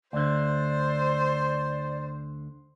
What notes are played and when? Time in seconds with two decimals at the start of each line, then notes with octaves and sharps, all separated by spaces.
0.13 D2 D3 C5 D5